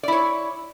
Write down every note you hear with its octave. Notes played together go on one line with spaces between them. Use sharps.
E4 C#5 D5